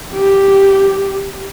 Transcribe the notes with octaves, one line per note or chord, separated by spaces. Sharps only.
G4